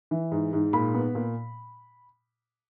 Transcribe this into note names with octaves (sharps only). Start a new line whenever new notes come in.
E3
G#2
G#2
A#2 B5
B3
A#2